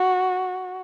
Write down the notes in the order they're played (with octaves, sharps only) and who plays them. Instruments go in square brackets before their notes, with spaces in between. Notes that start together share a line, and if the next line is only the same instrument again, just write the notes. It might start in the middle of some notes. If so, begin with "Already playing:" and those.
Already playing: [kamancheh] F#4